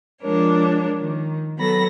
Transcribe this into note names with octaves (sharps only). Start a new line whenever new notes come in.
F3 G#3 D4 A#4 C#5
D#3
F#3 B3 A4 B5 A#6